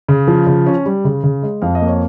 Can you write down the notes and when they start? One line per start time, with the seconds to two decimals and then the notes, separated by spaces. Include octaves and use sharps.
0.08 C#3
0.28 F3
0.47 C#3
0.66 C#4
0.86 G3
1.04 C#3
1.24 C#3
1.43 G#3
1.62 F2 F5
1.75 D#5
1.81 A#3
1.88 C#5